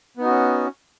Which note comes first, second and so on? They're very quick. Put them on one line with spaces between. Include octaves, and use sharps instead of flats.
B3 D#4 F#4 C#4